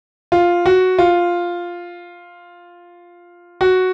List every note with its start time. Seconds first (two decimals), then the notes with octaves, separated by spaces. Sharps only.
0.32 F4
0.66 F#4
0.99 F4
3.61 F#4